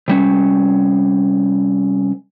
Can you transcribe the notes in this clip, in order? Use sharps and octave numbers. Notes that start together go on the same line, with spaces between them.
C3 G3 C#4